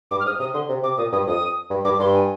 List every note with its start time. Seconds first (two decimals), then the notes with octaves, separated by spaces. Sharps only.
0.11 G2 D6
0.20 F6
0.25 G#2 D#6
0.40 C3 D#6
0.54 D3 C6
0.69 C3
0.83 C3 D6
0.98 A#2 D#6
1.12 G2 D#6
1.27 F2 D#6
1.70 G2
1.84 G2 D6
1.99 G2 C6
2.14 G#5